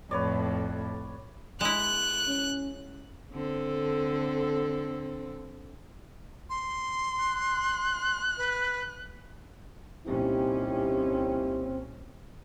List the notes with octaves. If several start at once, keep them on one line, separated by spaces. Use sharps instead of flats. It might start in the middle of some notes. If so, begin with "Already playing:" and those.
F2 A2 B4 C#5 D5
G#3 E4 F#6
C#4
D3 C4 A4
C6
F#6
B4
C2 A#2 C4 C#4 D#4 E4 G4